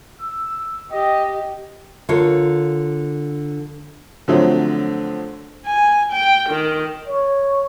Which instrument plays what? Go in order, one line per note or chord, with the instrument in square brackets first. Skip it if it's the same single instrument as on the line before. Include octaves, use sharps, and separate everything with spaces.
[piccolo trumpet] E6
[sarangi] G4 [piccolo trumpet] D#5
[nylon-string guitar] D3 F4 A#4 C#5
[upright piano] D3 F3 F#3 A3 C4
[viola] G#5
G5
D#3
[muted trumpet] C#5